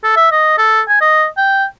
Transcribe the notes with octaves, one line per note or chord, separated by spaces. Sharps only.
A4
E5
D#5
A4
G#5
D#5
G5